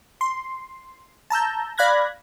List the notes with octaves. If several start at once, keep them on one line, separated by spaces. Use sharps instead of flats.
C6
A5 A#5 E6 G6
D5 F5 B5 F#6 G#6 A#6